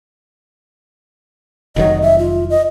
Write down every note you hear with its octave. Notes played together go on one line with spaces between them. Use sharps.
F1 D#3 F#3 D#5
E5
F4
D#5